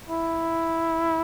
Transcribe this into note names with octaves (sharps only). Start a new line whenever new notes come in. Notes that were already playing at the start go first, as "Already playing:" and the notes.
E4